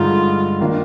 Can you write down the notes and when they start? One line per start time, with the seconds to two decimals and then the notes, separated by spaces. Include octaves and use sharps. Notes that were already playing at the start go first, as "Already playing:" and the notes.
Already playing: G2 D3 G#3 D#4 F4 G#4
0.60 D#3 A#3 D4 F4